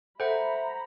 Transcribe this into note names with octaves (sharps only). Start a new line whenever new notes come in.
A4 C5 E5 F#5 A#5 B5